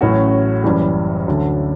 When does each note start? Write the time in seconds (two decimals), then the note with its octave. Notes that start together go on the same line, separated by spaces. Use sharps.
0.01 A1 A2 F#3 C#4 F#4
0.64 F#1 F#2 E3 G3
1.28 D2 D3 F#3